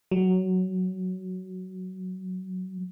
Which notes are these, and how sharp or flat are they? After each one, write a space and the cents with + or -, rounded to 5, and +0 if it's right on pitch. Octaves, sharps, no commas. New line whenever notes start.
F#3 +10